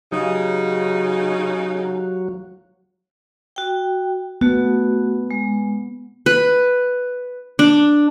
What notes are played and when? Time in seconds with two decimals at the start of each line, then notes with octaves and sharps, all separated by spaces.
0.12 C#3 F#3 D#4 G4 F5
3.56 F#4 G5
4.41 A3 B3 F#4
5.31 G#3
6.26 B4
7.59 D4